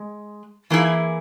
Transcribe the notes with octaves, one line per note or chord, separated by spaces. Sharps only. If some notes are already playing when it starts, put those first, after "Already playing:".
Already playing: G#3
E3 A#3 E4 G#4